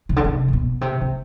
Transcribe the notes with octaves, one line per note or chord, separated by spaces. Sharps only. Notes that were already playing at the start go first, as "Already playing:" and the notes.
C3
D3
C3
A2
B2
C3
C3